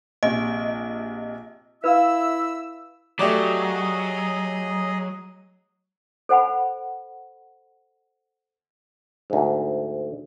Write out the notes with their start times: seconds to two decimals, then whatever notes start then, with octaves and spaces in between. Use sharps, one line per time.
0.23 A#1 C3 D#5
1.84 E4 B4 E5 F5 E6
3.19 F#3 A3 G4 G#4 D5 D#5
6.29 A4 C5 F#5 G#5 B5
9.30 D2 G#2